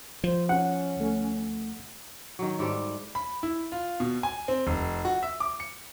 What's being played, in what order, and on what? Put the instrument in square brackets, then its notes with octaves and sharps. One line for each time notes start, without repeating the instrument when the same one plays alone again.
[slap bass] F3 [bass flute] C5
[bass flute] C#4 [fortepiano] F#5
[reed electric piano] D2 A3
[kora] D#3 F#3
G#2 G3 A4 D5
[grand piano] B5
E4
F4
B2
G#5
C4
F1
F#4
E5
D6
C#7